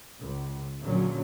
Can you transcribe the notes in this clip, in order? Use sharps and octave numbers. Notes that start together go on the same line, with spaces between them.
C#2
A#1 D3 F#3 C#4